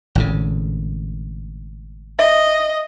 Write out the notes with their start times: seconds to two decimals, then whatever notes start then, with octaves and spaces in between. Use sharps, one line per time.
0.15 G#1 A2 C#3
2.19 D#5 E5